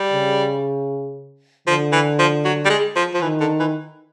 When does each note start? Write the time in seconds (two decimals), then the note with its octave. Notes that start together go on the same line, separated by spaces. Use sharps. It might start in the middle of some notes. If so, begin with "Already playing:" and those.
Already playing: G3
0.12 C#3
1.67 D3 F3
1.92 E3
2.19 F3
2.45 F#3
2.65 G3
2.70 G#3
2.96 F3
3.14 F3
3.22 D#3 E3
3.40 D3
3.60 E3